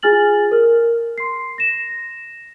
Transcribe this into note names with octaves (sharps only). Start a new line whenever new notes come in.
F4 G#4 G#5 F6 A6 F#7
A#4 F6
C6 C7
A#6 E7